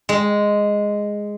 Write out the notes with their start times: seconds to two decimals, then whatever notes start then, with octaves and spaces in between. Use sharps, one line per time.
0.09 G#3